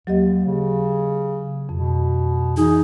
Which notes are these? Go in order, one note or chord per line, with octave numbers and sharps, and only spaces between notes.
D#2 F#3 G4 D#5
C#3
F2 B2
E3 D#4 G#4